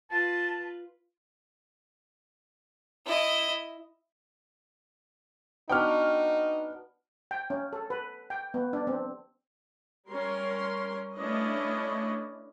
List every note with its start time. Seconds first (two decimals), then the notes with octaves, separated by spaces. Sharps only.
0.11 F4 B4 A5
3.06 E4 D#5
5.69 B3 D4 D#4 F#4 G5 F6
7.31 G5
7.50 C#4
7.73 A4
7.90 B4
8.30 G5
8.54 B3
8.73 D4
8.87 C4
10.09 G3 C#4 A#4 C6
11.15 A3 C#4 D4 E4 B4 D#5